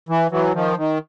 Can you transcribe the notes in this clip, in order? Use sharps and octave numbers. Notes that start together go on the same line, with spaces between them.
E3
E3 F#3
D#3 F3
D#3